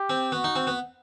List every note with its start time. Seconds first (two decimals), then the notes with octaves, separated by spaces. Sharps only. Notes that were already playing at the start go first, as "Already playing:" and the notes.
Already playing: G4
0.10 C4
0.32 B3 F#4
0.44 D#4
0.56 C4
0.67 B3